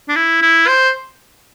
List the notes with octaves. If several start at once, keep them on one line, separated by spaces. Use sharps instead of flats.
D4
E4
E4
C5